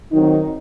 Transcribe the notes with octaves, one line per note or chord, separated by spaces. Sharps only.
D#3 F#3 C4 D#4